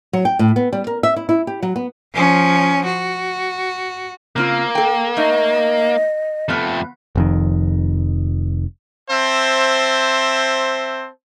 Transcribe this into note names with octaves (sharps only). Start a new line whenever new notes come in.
F#3
G5
A2
B3
G3
A#4
E5
E4
E4
G4
F#3
B3
F3 C#4
F#4
C#3 A#3 C4 F4
A4 G5
A3 D#4 D#5
F2 F3 A3 B3
F1 F2 D#3
C4 C5 E5 A5